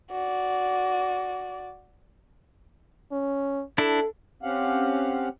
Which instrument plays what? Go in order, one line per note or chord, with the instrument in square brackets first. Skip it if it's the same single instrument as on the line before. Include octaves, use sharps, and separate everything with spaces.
[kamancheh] F#4 D5
[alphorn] C#4
[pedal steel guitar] D4 E4 [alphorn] A4
[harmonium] C4 C#4 G4 F5 F#5